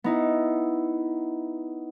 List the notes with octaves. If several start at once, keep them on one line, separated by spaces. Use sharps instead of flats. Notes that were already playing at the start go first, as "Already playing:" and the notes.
B3 D#4 E4